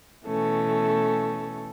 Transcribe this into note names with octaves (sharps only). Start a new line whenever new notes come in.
B2 E3 A3 C#4 A4